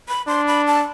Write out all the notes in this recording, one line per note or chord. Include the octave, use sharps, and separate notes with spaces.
B5
D4 C6
B5
A5